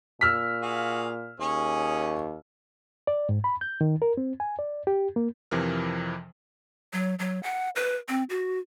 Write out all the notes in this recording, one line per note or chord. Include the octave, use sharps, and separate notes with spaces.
A#2 E6 F6 B6
F#4 G#4 F5
D#2 C#4 G#4 C#5
D5
G#2
B5
G6
D#3
A#4
C4
G#5
D5
G4
A#3
F2 C3 E3 F3 A#4 F6
F#3
F#3
F#5
B4
C4
F#4